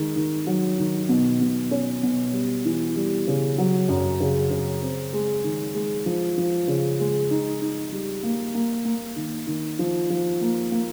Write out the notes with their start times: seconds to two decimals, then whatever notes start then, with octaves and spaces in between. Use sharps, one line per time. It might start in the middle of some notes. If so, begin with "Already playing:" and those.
Already playing: D#3 G#3
0.16 D#3
0.47 F#3
0.79 D#3
1.09 B2
1.41 B2
1.71 C#4
2.03 B2
2.33 G3
2.65 E3
2.96 G3
3.27 C#3
3.58 F#3
3.89 F#2
4.20 C#3
4.50 C#3
4.82 C4
5.13 G#3
5.44 D#3
5.74 G#3
6.06 F3
6.38 F3
6.68 C#3
7.00 G#3
7.31 D#4
7.61 D#4
7.92 G3
8.23 A#3
8.55 A#3
8.85 A#3
9.16 D#3
9.47 D#3
9.79 F3
10.10 F3
10.41 A#3
10.72 A#3